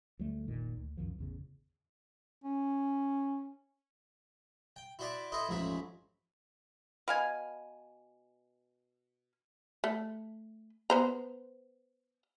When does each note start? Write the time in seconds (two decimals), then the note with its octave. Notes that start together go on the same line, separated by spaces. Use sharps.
0.19 D2 F#3 G3 A3
0.46 F1 A#1 A#2 D#3
0.77 D2
0.97 C2 F#2 D#3 F3
1.19 A1 E2 C#3
2.44 C#4
4.76 G5
4.99 E4 F#4 C5 D5 E5 D6
5.32 E4 A4 B4 C5 D#5
5.49 A1 F2 G#2 C#4 E5 B5
7.08 B2 F5 G#5
9.84 A3
10.90 B3 C5 A#5